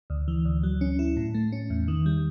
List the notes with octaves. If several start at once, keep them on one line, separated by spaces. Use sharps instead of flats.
D2
E3
D2
F#3
C#4
E4
A2
A3
C#4
E2
D#3
G3